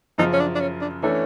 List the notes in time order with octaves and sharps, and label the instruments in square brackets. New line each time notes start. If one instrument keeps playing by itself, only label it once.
[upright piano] F#2 C#3 F3 [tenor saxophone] D#4
[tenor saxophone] C#4
D4
D4
C#4
D4
[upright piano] E3 A3 D4 [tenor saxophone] C#4